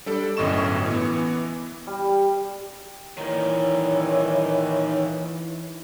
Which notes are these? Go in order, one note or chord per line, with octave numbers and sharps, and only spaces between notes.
G3 D4 A4 D5
G1 F#2 A2 D#5 C#6 E7
E3 B3
G3
A#2 D#3 E3 C#5